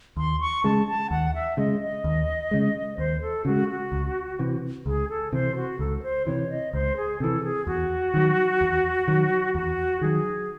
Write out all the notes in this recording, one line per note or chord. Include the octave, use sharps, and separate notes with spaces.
D#2 C6
C#6
C#3 G#3 A5
A5
D#2 F#5
E5
C#3 G#3 D#5
D#5
D#2
C#3 G#3
D#2 C5
A4
C#3 G#3 F#4
F#4
C#2
C3 E3
C#2 G#4
A4
C3 E3 C5
F#4
C#2 A4
A4
C5
C3 E3 C#5
D#5
C#2 C5
G#4
C3 E3 A4
G#4
E2 F#4
D#3 F#3
E2
D#3 F#3
E2 F#4
D#3 F#3 G#4